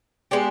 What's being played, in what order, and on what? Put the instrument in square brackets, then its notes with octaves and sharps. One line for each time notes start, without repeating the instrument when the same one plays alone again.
[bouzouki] G#3 B3 D4 G4